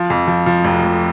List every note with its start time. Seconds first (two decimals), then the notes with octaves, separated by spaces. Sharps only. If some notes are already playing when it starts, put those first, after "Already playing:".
Already playing: F3
0.10 F2
0.27 F3
0.46 F3
0.65 F1
0.83 F1